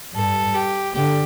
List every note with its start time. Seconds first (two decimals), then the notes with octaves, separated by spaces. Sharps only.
0.16 G2 A4
0.54 G4
0.94 D3 G4